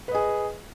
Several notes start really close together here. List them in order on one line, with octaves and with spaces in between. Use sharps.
B4 D#5 G#4